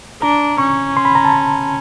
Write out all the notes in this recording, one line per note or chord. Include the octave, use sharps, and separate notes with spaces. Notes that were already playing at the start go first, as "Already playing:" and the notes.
D4 A#5
C#4 C#6
C6
B5
A#5
A5